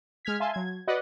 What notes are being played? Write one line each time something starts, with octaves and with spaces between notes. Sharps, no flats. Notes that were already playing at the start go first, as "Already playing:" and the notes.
G#3 F6 G#6 B6
E5 F5 G#5 A5 C6
F#3 G#6
F#4 B4 D5 D#5 F#5